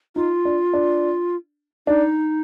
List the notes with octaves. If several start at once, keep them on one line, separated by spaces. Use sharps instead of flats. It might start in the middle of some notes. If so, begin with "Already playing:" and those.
D#4 F4
D4
D4
D4 D#4